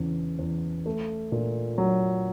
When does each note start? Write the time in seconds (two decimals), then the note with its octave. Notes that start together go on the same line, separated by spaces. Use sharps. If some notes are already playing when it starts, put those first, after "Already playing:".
Already playing: E2 C#3
0.39 E2
0.86 A3
1.32 A#2
1.78 F#3